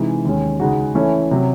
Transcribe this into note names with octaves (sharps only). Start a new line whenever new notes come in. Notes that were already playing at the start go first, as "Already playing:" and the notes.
Already playing: C3 E3 G#3 D#4
D#2 D#3 G#3 C#4
C#2 C#3 G#3 D#4 F#4
E3 A3 C#4 E4
C3 F#3